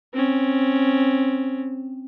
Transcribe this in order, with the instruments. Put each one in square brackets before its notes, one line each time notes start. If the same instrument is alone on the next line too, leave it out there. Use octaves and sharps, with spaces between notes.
[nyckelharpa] C4 C#4